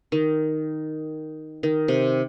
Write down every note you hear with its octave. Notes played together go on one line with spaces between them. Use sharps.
D#3
D#3
C3